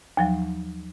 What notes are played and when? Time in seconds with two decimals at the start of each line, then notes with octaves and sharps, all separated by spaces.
0.17 D#2 F3 F#3